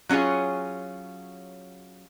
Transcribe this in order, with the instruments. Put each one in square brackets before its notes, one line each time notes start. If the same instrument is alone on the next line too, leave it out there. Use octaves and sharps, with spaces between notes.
[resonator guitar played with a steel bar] F#3 C#4 F4 G#4 C#5